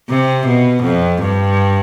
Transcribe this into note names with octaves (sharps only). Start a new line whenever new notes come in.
C3
B2
F2
G2